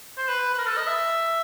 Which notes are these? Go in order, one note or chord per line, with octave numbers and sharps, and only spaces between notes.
C5
B4
B4
A#4
A4
D#5
E5